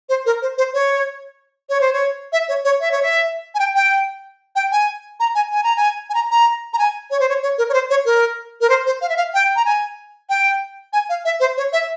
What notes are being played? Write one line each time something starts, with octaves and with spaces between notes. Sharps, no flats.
C5
A#4
C5
C5
C#5
C#5
C5
C#5
E5
C#5
C#5
E5
C#5
E5
G#5
G5
G5
G5
G#5
A#5
G#5
G#5
A#5
G#5
G#5
A#5
A#5
A#5
G#5
C#5
C5
C#5
C#5
A#4
C#5
C5
C#5
A#4
A#4
C5
C5
F5
E5
F5
G5
A#5
G#5
G5
G#5
F5
E5
C5
C#5
E5